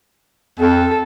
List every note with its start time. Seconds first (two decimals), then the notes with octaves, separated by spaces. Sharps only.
0.59 F2 A4